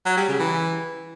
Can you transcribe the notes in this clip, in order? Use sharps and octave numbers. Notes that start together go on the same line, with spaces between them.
F#3
G3
C#3
E3